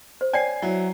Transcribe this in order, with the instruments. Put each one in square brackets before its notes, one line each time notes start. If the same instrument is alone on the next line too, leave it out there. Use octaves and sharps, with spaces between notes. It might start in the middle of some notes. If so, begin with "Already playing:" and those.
[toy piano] C5
[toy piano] C#5 D5 G5 [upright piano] G#5 C7
[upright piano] F#3 E4